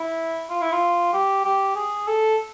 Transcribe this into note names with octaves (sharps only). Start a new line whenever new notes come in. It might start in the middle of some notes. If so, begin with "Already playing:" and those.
Already playing: E4
F4
E4
F4
G4
G4
G#4
A4